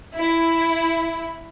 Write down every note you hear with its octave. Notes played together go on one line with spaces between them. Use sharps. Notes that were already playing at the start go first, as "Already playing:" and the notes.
E4